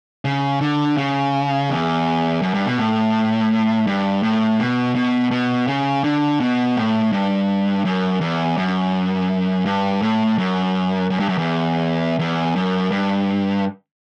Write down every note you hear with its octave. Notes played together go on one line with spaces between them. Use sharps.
C#3
D3
C#3
E2
F#2
G2
B2
A2
G2
A2
B2
B2
B2
C#3
D3
B2
A2
G2
F#2
E2
F#2
G2
A2
F#2
F#2
G2
F#2
E2
E2
F#2
G2